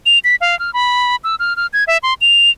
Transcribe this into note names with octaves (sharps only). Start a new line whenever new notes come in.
F7
B6
F5
F6
B5
E6
F6
F6
G#6
E5
C6
F7